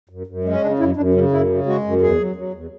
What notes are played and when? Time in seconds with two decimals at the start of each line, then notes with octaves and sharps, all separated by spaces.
0.09 F#2
0.27 F#2
0.44 G#3 C#4
0.62 C#3 D4
0.79 F#2 E4
0.96 F#2 D4
1.14 C#3 C#4
1.32 F#2 E4
1.49 C#3
1.66 G#3 F#4
1.84 F#2
2.01 E2 G#4
2.18 F#3
2.36 F#3
2.53 E2